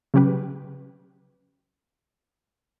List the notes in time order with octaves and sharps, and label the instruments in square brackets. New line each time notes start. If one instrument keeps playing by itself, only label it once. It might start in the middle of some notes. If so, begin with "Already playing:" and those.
[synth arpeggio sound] C#3 F#3 C#4 G4 B4